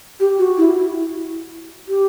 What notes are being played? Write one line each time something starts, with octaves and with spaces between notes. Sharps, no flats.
G4
F#4
E4
G4